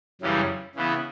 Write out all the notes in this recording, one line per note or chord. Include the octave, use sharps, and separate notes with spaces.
F#2 C#3 E3 G3 C#4
C#3 E3 B3 E4